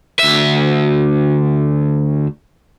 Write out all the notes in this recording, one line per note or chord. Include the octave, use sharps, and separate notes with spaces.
D2 E5